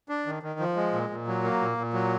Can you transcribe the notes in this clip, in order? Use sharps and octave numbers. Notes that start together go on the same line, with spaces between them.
D4
D#3
D#3
F3
G#3
A#2
A#2
F#3
A#3
A#2
A#2
F#3